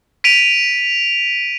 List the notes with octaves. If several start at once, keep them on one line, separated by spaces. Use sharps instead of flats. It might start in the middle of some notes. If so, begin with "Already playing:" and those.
B6 D7 D#7 F7